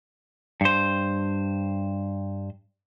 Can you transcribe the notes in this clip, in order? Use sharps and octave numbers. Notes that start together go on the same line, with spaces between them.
G2 C5